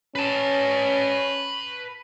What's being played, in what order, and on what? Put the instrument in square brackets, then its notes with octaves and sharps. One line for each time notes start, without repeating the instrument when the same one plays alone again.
[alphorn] C#4 [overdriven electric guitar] B4 A5